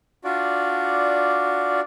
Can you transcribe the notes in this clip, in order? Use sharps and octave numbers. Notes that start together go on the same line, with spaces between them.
D4 F4 F#4 D5